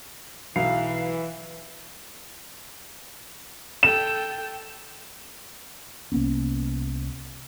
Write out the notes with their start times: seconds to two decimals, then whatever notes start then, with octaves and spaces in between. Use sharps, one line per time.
0.56 B1 E3 F5
3.83 A4 G5 E7
6.12 C2 A#3 B3 C#4